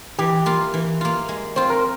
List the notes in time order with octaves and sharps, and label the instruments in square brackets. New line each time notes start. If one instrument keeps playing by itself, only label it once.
[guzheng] E3 [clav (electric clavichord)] G4
[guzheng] A#3 F4
E3
A#3 F4
G#3
[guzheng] C4 F4 [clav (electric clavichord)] C5
[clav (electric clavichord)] A#4